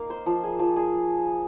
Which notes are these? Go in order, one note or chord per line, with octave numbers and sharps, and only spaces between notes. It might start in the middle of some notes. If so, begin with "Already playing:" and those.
Already playing: A#3 D#4 A#4 F5
C5
F3
G#4
F3
G#4